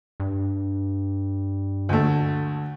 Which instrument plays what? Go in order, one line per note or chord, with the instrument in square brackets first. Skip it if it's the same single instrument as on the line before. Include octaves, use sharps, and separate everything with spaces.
[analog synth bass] G2
[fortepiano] D2 A3